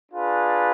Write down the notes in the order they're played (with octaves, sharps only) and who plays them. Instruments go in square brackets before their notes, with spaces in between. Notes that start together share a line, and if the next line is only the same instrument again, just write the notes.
[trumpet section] D4 F4 G#4 B4